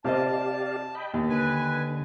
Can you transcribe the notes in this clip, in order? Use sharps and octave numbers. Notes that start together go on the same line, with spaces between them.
C3 G4 C5 D5 D#5 F5 A5
D#5 G5 B5
D#2 D#4
D3 B4 G#5